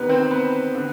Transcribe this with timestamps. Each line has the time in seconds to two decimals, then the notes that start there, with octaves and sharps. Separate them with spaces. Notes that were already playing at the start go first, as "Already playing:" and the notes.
Already playing: E2 C3 D#3 B3 B4
0.09 C4 C5
0.31 B3 B4
0.75 D3